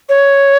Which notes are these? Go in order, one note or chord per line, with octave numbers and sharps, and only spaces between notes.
C#5